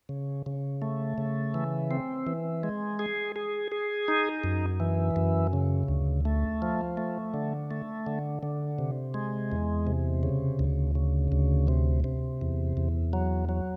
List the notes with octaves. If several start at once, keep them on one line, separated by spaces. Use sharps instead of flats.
C#3
C#3
A3
C#3
E3
C4
E3
G#3
G#4
G#4
G#4
D#4
F#2
E3
F#2
C#3
D2
A3
F3
A3
D3
A3
D3
D3
C3
G#3
E2
C3
C#3
D2
C#3
D2
C3
C3
E2
E2
F#3
F#3